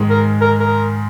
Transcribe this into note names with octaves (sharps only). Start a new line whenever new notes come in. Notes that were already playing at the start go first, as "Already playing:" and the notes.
Already playing: G#2 D#3 G#3
A#4
A#4
A#4